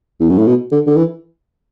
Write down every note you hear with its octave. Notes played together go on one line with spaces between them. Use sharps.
E2
F#2
A2
B2
D3
D3
E3